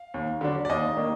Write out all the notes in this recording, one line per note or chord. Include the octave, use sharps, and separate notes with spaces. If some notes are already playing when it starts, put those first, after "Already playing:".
Already playing: F5
D#2
D3 F#3 D4
D5
D#2 D#5
D#3 A#3 D4